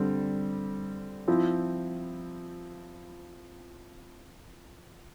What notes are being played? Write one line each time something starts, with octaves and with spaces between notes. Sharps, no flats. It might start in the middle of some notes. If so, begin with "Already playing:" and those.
Already playing: D3 G3 C4
F3 C4 E4